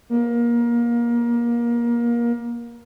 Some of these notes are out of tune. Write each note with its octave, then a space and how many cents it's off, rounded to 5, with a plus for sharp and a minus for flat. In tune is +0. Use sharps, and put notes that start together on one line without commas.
A#3 +25